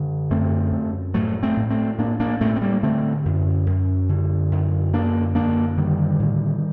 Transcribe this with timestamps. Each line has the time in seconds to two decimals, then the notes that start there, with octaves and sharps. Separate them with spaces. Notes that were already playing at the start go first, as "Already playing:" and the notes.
Already playing: F#2 D3
0.31 F#2 A3 C4
0.72 F#2
1.14 A2 F#3 A3
1.43 A3 C4
1.57 A2
1.70 A3 C4
1.98 A2 A#3 D4
2.20 A#3 D4
2.41 A2 A3 C4
2.56 C4
2.61 G3 A#3
2.83 D3 A3 C4
3.25 F#2
3.66 F#2
4.09 D3
4.51 F#2
4.93 D3 A#3 D4
5.35 F#2 A#3 D4
5.77 D3 D#3 G3
6.19 A2